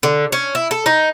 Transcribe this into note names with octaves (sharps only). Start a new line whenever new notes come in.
D3
C#4
E4
A4
D#4